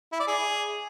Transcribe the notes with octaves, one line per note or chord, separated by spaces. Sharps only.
E4
D5
G#4